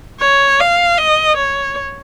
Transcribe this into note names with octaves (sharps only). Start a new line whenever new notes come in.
C#5
F5
D#5
C#5